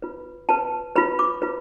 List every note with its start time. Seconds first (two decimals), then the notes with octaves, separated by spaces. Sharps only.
0.02 F4 B4
0.49 F4 B4 A5
0.96 F4 B4 B5
1.19 D6
1.42 F4 B4